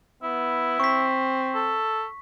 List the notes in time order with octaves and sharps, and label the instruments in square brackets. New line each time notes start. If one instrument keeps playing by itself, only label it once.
[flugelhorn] B3 [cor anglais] E4
[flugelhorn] C4 [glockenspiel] C#6 B6
[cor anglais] A4